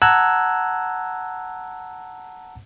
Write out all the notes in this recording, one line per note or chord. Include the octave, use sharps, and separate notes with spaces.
F#5 A5 A#5 E6 F#6 G#6